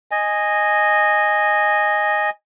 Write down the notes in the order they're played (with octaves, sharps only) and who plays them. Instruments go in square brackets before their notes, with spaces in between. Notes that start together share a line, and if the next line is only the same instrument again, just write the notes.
[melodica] D#5 G#5